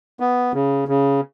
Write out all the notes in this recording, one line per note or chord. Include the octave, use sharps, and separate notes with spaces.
B3
C#3
C#3